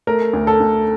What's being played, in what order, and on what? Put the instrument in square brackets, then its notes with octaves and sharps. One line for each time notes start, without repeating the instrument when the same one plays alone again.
[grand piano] A3 A#4
D2
A4
D2